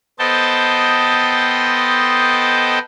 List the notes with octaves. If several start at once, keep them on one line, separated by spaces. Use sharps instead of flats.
B3 A4 C5 D#5 G5 A5